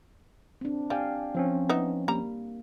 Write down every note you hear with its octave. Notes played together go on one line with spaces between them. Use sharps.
C4 D4
G3 D5 F5 G5 G#5
F3 C4 C#4
B3 D#4 E5
G3 A#3 A#5